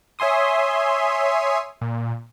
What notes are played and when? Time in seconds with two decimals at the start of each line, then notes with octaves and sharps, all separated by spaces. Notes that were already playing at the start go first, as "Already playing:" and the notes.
0.19 C#5 E5 G#5 C6 D#6
1.81 A#2